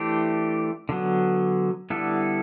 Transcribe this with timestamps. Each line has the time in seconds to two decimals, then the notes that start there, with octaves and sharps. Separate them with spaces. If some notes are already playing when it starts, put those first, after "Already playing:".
Already playing: E3 A3 D4 G4 C5
0.89 D3 F#3 B3
1.90 D3 G3 B3 E4 A4